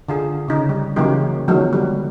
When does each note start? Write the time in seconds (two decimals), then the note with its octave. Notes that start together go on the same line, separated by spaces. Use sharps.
0.09 D3 F4 G#4
0.48 C#3 D#4
0.69 G3
0.96 C#3 E3 F#3 A#3 D#4 G4
1.48 D3 D#3 F3 F#3 G#3 B3
1.73 G3